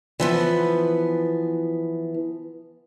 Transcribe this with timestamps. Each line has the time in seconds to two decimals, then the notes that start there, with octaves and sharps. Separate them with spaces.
0.20 E3 F3 B3